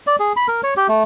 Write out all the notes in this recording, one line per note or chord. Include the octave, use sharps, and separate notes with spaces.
D5
G#4
B5
A#4
C#5
G4
A3